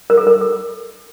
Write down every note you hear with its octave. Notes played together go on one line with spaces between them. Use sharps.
A#4
A4
A#4
A4